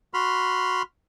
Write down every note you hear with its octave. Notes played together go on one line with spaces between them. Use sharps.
F#4 B5 C6 F6